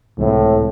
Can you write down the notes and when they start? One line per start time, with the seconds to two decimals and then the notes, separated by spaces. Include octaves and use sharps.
0.18 C#2 A2 C3 E3 G#3 C4